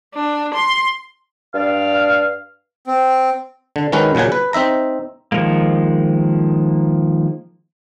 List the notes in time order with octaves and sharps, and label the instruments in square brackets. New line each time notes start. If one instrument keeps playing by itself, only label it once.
[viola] D4
C6
[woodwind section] G2 D5 F5
[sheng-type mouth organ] C4
[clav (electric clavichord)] D3
D#3 F#3 G#3 C#4 D#4 B4
A#2 C#3 F#3 F#5 G#5
B4
C4 D#4 E5 A#5
[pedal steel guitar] D#3 F3 G#3 A#3